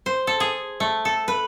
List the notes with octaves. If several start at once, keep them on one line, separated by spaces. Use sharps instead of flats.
C5
A4
G#4
A3
A4
B4